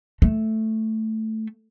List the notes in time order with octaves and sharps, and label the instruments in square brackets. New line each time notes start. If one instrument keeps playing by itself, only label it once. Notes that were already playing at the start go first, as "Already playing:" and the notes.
[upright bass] A3